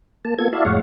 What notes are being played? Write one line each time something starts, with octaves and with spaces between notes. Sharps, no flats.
A#3 A5
A#3 B3 F4 A4 G#6
E4 F#4 D5 E5 F5 A5
F2 A2 G#3 C#5 F5 F#5